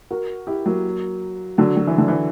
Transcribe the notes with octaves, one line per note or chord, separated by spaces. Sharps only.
F#4 A#4
E4 G4
F#3 A#3
D3 F#3
F#3
E3
D3
E3